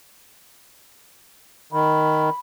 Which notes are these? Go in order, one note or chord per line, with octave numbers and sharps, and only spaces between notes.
D#3 B5